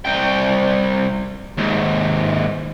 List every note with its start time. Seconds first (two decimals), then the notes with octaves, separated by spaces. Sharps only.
0.05 C2 G5
1.58 D#2 G#2